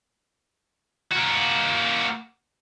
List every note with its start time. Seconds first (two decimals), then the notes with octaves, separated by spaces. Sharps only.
1.12 A#3 F#4